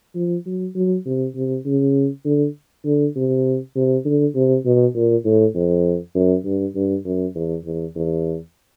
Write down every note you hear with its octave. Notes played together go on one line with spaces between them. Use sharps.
F3
F#3
F#3
C3
C3
C#3
D3
D3
C3
C3
D3
C3
B2
A#2
A2
F2
F#2
G2
G2
F#2
E2
E2
E2